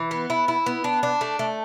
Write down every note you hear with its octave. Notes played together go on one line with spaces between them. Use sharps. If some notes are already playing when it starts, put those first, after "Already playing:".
Already playing: E3
B3
E4
E4
B3
D4
D4
A3
A3